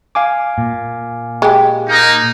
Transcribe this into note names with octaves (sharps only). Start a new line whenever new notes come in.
F5 G#5 D6
A#2
G#3 G4
A#3 D#4